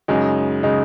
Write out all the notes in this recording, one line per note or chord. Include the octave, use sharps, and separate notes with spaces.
F#2 C#3 G#3 D#4
C#3 G#3 D#4